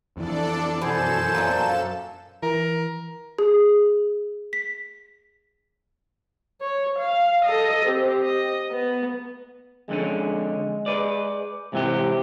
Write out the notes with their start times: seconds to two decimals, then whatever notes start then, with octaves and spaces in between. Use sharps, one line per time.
0.17 F2 E3 D4 A4 D5
0.82 F#2 B2 A4 C5 G#5 E7
1.35 A#2 F3 D4
2.43 E3 A#4
3.38 G#4
4.53 B6
6.61 C#5
6.99 F5
7.45 A4 D#5
7.86 C4 G4
8.23 D#5
8.72 B3
9.89 F2 D3 G#3 C#4
10.86 B4 D5
11.73 G#2 C3 E3 G4